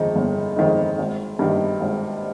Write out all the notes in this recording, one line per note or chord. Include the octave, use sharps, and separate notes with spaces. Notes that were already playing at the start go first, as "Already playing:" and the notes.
Already playing: F2 D#3 G#3 D#4
G1
F2 D#3 G#3 D#4
G#1
G2 D#3 G3
G#1